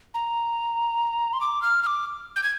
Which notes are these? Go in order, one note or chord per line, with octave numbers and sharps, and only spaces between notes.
A#5
C6
D6
F6
F6
D6
G6
G#6